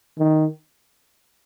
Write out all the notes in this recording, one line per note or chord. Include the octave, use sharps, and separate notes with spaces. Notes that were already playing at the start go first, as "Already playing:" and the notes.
D#3